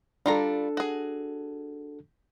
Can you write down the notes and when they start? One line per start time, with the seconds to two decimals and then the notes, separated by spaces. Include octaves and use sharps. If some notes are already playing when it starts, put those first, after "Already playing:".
0.26 G3 D4 F4 A4 A#5
0.77 F#4 G#4